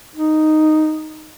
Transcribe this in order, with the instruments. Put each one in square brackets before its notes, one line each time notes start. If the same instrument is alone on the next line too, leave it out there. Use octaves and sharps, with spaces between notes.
[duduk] D#4